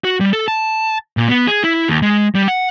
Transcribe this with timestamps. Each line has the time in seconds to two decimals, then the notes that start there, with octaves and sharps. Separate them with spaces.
0.04 F#4
0.20 G3
0.33 A4
0.48 A5
1.17 A#2
1.29 B3
1.47 G#4
1.64 E4
1.88 D#2
2.02 G#3
2.35 G3
2.48 F#5